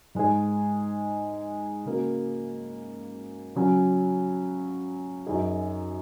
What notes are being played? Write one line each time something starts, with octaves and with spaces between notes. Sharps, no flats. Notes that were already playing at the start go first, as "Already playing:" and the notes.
G#2 G#3 D#4 G#4
C#3 A#3 F#4
C#3 F#3 C#4 F#4
F#2 F#3 D#4 G#4